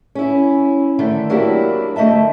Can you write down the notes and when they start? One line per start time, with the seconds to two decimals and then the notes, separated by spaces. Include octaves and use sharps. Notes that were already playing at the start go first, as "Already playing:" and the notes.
0.15 C#4 E4
0.99 D3 D#3 A3
1.30 F#3 A#3 D4 E4 F#4 G4
1.96 D3 A3 D#5 E5 A5